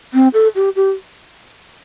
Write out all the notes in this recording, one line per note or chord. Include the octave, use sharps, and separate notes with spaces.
C4
A4
G4
G4